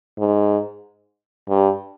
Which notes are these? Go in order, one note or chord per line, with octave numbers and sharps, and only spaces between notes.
G#2
G2